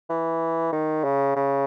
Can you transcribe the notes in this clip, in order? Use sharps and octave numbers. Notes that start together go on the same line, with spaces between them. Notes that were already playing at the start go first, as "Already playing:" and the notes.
E3
D#3
C#3
C#3